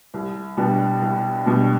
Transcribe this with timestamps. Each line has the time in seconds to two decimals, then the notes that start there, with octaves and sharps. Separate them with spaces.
0.14 C2
0.57 B2 G3 B3 D4
1.02 C2
1.45 B2 G3 B3 D4